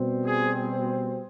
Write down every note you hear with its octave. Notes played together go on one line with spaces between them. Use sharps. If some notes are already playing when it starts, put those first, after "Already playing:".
Already playing: B2 G3 C4
G#4